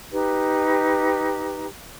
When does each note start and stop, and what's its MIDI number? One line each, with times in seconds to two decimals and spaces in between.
0.12 1.66 63
0.12 1.66 67
0.12 1.66 71